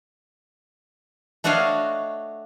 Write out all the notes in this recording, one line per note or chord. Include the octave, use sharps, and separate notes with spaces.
A3 D4 F#4 C#5 D#5 F5